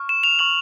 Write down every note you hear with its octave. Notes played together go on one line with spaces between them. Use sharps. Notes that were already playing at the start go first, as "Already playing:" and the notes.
Already playing: C#6 F6
E7
F7
C#6 F6 F#7